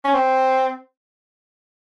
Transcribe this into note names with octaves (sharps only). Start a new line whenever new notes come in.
C#4
C4